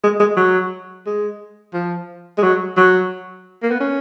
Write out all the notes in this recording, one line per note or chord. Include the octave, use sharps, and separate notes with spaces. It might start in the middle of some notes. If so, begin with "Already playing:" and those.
G#3
G#3
F#3
G#3
F3
G#3
F#3
F#3
A#3
B3
C#4